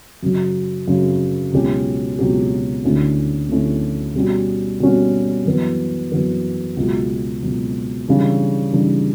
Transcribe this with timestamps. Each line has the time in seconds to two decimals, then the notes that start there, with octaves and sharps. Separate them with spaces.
0.23 F#2 C#3 F#3
0.88 F#2 C#3 F#3
1.53 C#2 B2 F#3 C#4 G4
2.19 C#2 B2 F#3 C#4 G4
2.84 D2 D3 A3 C#4 E4
3.49 D2 D3 A3 C#4 E4
4.15 B2 G3 C#4 F#4
4.80 B2 G3 C#4 F#4
5.45 F#2 E3 B3
6.12 F#2 E3 B3
6.77 C#2 B2 F#3
7.42 C#2 B2 F#3
8.08 C#3 E3 G3 D4
8.73 C#3 E3 G3 D4